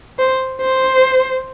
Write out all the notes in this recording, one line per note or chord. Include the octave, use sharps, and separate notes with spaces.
C5
C5